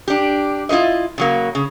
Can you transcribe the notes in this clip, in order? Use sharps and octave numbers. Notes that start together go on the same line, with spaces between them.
D4 G4
E4 F4 A4 C5 D#5
C#3 F#3 A#3
C#3